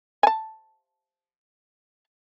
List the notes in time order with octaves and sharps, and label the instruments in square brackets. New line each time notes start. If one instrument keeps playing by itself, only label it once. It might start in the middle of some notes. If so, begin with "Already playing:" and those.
[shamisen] G#5 A5